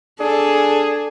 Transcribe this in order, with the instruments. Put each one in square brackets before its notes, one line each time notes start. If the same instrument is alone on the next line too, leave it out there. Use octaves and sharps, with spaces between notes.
[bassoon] D4 [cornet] G#4 [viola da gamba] A4